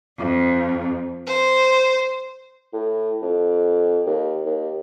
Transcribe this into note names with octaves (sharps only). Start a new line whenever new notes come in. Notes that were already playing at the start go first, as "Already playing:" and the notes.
F2
C5
A2
F2
D#2
D#2